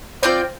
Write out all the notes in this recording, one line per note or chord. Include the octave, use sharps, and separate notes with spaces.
C4 F4 C5 D5 G5